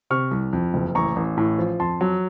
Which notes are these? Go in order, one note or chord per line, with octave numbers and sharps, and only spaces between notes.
C3 C#6 F6
C2
F2
F#1
A1 A#5 C#6
A1
A2
F3
F2 A5 C6
F#3